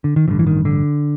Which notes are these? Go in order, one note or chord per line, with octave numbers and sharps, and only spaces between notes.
D3
D#3
A1 G2 D3 E3
E3
D#3
D3